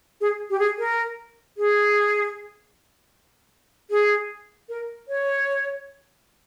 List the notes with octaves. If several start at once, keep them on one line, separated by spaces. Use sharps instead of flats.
G#4
G4
G#4
A#4
G#4
G#4
A#4
C#5